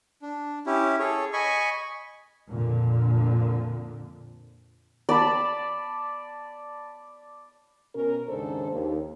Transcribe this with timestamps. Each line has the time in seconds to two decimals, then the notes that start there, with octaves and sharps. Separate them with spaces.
0.22 D4
0.66 C#4 E4 G4
0.99 G#4 A4 C#5
1.33 D#5 G#5 B5 C#6
2.48 F2 A#2 D3
5.09 D5 A5 B5
7.95 B2 C#4 A#4
8.28 D#2 G#2 C#3 D4 A4 C5
8.71 D#2